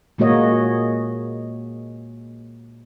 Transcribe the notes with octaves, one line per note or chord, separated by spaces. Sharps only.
A#2 G#3 A#3 F#4 C#5 D#5